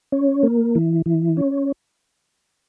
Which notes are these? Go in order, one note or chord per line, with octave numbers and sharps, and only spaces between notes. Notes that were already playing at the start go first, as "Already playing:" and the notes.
C#4
A#3
E3
E3
C#4